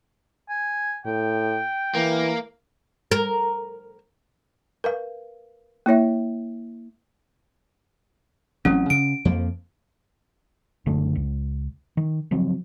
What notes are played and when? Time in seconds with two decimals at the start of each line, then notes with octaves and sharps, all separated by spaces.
0.49 G#5
1.05 A2 G5
1.95 E3 A#3
3.11 A#4
4.84 A#4 B4 F5
5.86 A#3 E4 C#5 E5
8.65 A1 F#3 C4 C#4
8.90 C#3 D7
9.25 F2 F3 A#3
10.86 F#1 D3 A3
11.15 C#2
11.97 D#3
12.31 C#3 F3 F#3 C4